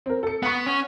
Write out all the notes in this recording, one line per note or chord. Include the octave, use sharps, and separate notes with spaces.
C4 A#4
A4 C#7
B3 F#5 C#6
C#4